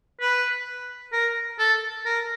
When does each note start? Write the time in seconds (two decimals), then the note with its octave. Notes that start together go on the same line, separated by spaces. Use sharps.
0.21 B4
1.12 A#4
1.59 A4
2.05 A#4